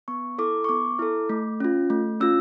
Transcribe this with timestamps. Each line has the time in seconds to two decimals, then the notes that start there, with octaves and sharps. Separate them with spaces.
0.08 B3 C#6
0.38 E4 A4 D6
0.64 C#6
0.69 B3 D6
0.99 E4 A4
1.29 A3
1.60 C#4 F4
1.90 A3
2.20 C#4 F4 E6